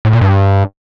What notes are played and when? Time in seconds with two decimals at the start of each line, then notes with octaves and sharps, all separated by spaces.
0.05 A2
0.13 A#2
0.21 G2